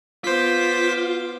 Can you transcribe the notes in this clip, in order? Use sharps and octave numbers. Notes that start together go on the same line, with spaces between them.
B3 F4 C5 D6 B6